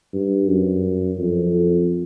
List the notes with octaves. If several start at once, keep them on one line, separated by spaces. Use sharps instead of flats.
G2
F#2
F2